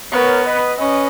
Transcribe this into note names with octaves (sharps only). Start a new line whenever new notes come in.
B3 A#4 C#5
B4 D#5
C#4 B4 D#5